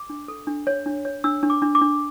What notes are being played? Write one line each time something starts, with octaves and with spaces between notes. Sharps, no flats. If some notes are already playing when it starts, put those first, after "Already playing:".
Already playing: D6
D4
A4
D4
C#5
D4
C#5
D4 E6
D4
D6
D4
D6
D4